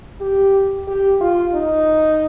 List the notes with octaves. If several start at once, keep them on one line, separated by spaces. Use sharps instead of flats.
G4
G4
F4
D#4